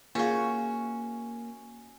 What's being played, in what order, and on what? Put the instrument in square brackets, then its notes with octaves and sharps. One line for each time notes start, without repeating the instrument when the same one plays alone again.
[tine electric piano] A#3 [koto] C#4 F#4 [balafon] F4 G#4 F5